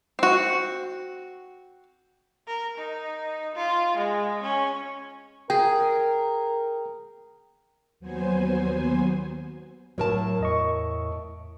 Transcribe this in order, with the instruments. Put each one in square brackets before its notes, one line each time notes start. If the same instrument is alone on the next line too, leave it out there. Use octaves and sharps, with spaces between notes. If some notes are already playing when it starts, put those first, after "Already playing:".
[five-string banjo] C4 F#4
[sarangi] A#4
D#4
F4
G#3
C#4
[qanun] G#4 [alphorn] A#4 [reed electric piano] G5
[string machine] D#2 F#3 B3 C5 G#5
[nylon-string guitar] A2 A#4 A5 [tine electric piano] F#3
[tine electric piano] E2 D#5 C#6